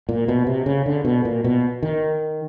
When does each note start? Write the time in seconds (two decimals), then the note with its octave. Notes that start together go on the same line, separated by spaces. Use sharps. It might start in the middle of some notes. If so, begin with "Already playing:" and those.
0.09 A#2
0.28 B2
0.47 C3
0.66 C#3
0.86 D3
1.05 B2
1.25 A#2
1.44 B2
1.83 D#3